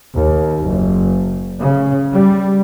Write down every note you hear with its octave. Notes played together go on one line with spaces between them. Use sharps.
D#2
F#1
C#3
G3